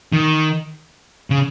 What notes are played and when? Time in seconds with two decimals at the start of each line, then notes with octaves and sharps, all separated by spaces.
0.13 D#3
1.30 C#3